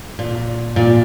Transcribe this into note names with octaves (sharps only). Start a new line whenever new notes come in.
A#2
A#2